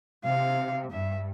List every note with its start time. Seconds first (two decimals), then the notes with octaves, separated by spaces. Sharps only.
0.24 C3 F5
0.91 G2 E5